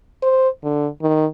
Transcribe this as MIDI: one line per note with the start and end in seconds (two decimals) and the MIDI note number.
0.22 0.49 72
0.63 0.87 50
1.02 1.26 51